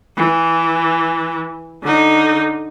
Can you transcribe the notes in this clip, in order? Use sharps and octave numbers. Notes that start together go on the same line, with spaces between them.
E3
D3 D#4